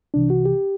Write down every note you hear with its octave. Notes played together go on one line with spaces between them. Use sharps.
C2 C3 E3 D4
F#4
G4